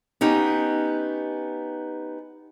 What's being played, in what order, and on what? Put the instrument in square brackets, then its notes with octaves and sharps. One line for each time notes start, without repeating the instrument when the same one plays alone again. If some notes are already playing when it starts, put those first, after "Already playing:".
[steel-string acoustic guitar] B3 C#4 D#4 G4